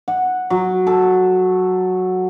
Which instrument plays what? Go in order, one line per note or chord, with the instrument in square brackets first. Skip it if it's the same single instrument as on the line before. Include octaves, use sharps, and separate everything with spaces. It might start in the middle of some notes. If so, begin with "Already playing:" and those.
[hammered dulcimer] F#5
F#3
A4